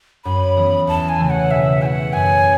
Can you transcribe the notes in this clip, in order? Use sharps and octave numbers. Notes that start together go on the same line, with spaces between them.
F#2 B5
E3 B3
E2 A5
G#5
C#3 E3 A3
F#5
B2 E5
A3 E4 B4 F#5 G#5
F#2 G#5